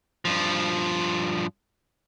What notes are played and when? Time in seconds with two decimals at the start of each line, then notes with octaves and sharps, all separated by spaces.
0.25 G2 F3